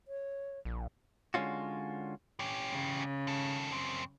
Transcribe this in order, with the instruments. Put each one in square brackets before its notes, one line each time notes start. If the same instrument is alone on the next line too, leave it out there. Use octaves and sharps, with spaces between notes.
[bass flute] C#5
[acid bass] A#1
[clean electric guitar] D3 G#3 A3 C#4 F4 F#4
[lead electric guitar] C#4 G4
[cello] C#3
[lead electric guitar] D#3 A4
F#2 C4